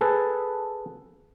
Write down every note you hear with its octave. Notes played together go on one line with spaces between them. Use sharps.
G#4 A4 B4